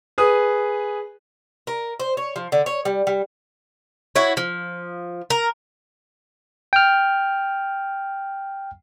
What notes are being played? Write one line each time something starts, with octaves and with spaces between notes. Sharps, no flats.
G#4 B4 D#6
A#4
C5
C#5
F3
D3
C#5
G3
G3
E4 F#4 C#5
F3
A#4
G5 F6